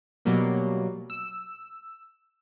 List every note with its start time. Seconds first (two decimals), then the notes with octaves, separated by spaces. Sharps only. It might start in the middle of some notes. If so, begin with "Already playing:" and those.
0.25 B2 F#3 G3 A#3
1.10 E6